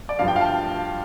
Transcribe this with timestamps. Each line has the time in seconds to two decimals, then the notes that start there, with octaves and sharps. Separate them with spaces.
0.09 D5
0.19 G2 F3 F5
0.28 G5
0.36 F5
0.41 A5
0.45 G5